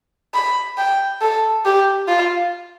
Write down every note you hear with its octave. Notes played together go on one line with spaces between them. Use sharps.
B5
G5
A4
G4
F4